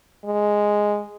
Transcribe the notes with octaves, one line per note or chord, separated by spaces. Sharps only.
G#3